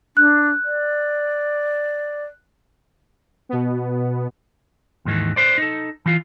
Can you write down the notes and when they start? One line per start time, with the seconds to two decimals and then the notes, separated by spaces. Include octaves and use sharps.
0.17 D4 F#6
0.65 D5
3.49 B2 B3
5.05 D#2 G#2 D#3 E3
5.36 B4 C5 D5
5.58 D#4 A4
6.06 E3 F4